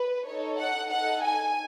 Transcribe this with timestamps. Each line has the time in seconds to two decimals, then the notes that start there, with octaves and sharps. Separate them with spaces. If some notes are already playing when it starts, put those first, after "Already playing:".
Already playing: B4
0.26 D#4 A4 C#5
0.59 F#5
0.91 D#4 A4 F#5
1.22 G#5